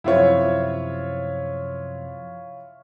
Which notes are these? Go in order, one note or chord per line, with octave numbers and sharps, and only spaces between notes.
F#2 C3 F3 E4 F4 C#5